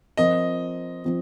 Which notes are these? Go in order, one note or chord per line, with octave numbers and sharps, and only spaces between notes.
F3 C4 F4 A#4 D#5
F3 C4